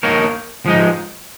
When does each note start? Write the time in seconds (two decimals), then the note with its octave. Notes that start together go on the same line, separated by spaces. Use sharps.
0.03 A#3 D#4 A#4 C#5
0.66 F3 G#3 D#4